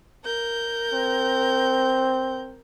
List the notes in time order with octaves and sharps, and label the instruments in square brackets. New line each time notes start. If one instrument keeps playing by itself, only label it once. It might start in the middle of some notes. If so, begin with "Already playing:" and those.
[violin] A#4 G6
[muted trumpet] C4